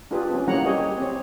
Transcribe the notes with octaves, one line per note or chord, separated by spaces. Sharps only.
D4 F4 G4 G#4 B4
C4 C#4
G3 A#3 E4 C#5 F#5 A#5
G4 G#4 C#5 D#5
C4 C#5